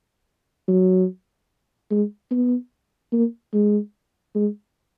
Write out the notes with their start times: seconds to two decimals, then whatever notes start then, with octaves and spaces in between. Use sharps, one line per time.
0.68 F#3
1.90 G#3
2.31 B3
3.12 A#3
3.53 G#3
4.35 G#3